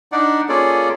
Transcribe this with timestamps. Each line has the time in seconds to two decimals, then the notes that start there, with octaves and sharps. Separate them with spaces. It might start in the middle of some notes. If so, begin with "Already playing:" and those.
0.12 D4 D#4 D5 F#5
0.49 A#3 C#4 F4 G#4 A4 D5